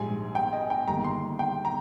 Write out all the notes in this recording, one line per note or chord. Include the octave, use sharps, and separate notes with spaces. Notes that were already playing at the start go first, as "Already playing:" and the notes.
Already playing: A#1 G#2 G3 G#5
G5
D#5
G5
G1 G2 D#3 G3 A#3 A#5
C6
G5
A#5